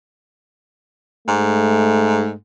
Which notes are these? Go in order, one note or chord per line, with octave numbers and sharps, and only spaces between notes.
G#2 A3